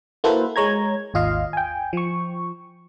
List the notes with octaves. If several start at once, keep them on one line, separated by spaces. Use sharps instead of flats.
A#3 E4 F#4 A4 B4 C5
G#3 C#5 A#5 G#6
G#1 D#2 F4 D#5 F5
G5 G#5
F3 C#6